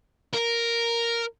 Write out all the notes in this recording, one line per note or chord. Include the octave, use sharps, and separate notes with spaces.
A#4